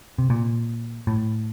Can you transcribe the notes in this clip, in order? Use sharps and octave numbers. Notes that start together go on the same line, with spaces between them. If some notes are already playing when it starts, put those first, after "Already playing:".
C3
A#2
A2